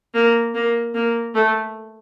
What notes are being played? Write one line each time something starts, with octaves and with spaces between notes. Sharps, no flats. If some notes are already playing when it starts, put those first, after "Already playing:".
A#3
A#3
A#3
A3